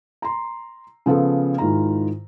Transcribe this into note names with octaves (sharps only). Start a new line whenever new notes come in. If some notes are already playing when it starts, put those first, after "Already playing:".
A#5 C6
C#3 F3 B3 A4
G#2 D#3 E4 F4 A#5